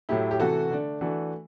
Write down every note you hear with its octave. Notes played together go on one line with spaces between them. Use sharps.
A2 F#3 A3 E4 G4
G4
C3 E3 A3 F#4 A4
D3 A3 D4
E3 A3 D4 F#4